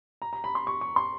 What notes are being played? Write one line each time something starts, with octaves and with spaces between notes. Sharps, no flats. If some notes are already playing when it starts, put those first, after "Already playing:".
A#5
A#5
B5
C6
C#6
C#6
C6